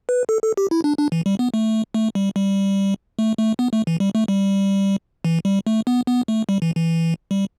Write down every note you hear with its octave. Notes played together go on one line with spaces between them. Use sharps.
B4
A4
A4
G4
E4
D4
D4
E3
G3
B3
A3
A3
G3
G3
A3
A3
B3
A3
E3
G3
A3
G3
E3
G3
A3
B3
B3
A3
G3
E3
E3
G3